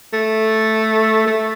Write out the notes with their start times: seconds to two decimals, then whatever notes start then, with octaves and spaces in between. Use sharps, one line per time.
0.13 A3
1.27 A3